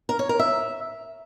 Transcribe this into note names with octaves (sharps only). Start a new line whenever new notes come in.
A#4
C#5
A#4
E5